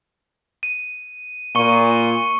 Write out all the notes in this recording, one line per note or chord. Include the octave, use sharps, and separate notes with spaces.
D#7
A#2 C#6 C#7 G7